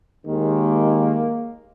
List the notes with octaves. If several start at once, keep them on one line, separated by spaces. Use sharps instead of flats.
D#2 D#3 G#3 A#3